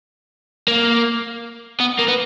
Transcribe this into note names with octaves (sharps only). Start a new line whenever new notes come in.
A#3
B3
A#3
B3